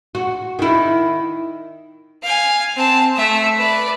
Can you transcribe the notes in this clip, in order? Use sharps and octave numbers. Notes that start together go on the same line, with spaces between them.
F#4
D#3 E4
F5 G#5
C4 A5
A3 E5
B4 D5